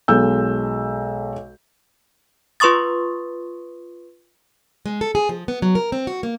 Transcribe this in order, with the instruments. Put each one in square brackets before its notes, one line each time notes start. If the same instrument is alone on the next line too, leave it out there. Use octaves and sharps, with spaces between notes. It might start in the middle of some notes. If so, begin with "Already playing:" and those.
[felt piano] B1 G#3 A4 E6 G6
[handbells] F4 B4 C6 C#6 D#6 A6
[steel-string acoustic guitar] G#3
A4
G#4
F3
B3
F#3
A#4
C4
F#4
A#3